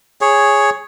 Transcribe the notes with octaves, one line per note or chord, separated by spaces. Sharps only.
G#4 C#5